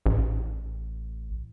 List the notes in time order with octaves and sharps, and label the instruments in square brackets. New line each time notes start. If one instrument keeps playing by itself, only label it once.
[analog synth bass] A1